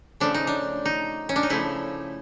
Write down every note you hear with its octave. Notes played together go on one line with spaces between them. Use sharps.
C#3 F3 A3 D4
D#4
D4
D#4
C#4
D4
D#4
C#3 F3 A3 E4